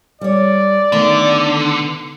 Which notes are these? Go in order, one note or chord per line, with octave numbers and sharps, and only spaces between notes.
G3 C#5 D5
D3 D#3 A3 B3